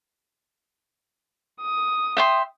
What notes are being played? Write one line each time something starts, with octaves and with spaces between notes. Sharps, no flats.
D#6
E5 G5 C6